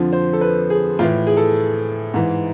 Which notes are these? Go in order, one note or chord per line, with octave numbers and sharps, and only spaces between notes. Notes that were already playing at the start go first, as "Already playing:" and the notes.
Already playing: F2 D3 F3
C5
A4
B4
G#4
A2 E3 F4
G#4
A4
G#2 E3